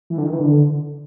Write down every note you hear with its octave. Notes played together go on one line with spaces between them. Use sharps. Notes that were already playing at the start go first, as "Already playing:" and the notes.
E3
D3
D#3
E3
D3